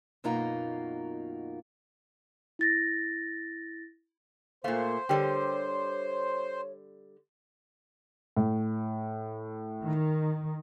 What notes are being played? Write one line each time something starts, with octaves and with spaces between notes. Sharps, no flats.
F#2 B2 A#3 D#4 F4 A#5
E4 A6 A#6
A#2 A3 A#3 C5 F5
D3 G3 G4 A#4 C#5
A2
D#3